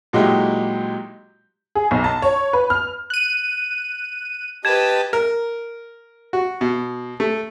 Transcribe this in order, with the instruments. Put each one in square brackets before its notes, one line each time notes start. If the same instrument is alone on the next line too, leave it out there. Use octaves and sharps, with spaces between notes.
[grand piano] A#2 F#3 G#3 D#4 E4 G4
[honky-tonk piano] G#4
B1
A5
C#5
B4
F6
[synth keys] F#6 D#7
[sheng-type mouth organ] G4 A5 [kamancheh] B4 D#5 [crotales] G#6 E7
[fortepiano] A#4
F#4
B2
A3